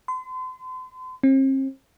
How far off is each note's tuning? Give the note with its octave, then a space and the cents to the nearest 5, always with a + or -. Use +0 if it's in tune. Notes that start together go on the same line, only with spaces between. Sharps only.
C6 -40
C4 +40